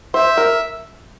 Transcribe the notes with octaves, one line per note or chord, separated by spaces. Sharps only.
C5 E5
A#4